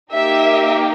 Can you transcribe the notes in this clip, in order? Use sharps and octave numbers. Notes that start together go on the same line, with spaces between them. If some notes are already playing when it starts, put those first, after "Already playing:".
A#3 D#4 G4 E5